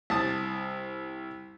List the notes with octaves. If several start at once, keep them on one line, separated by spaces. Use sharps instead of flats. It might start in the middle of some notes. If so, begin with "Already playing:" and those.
C2 A5 D#6